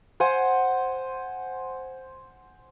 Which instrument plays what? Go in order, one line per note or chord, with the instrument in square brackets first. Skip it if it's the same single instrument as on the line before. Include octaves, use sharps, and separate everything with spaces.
[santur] C5 F#5 G#5